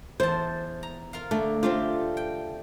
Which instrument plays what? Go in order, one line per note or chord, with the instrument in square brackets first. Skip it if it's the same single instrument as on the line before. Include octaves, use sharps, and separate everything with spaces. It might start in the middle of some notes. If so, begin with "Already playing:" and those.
[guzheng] E2 A5 [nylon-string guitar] C5
[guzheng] A#5
F4 A#4 F5
[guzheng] D3 [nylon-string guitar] A3
[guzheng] A3 G4 [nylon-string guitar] C4 D4 F4
[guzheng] G5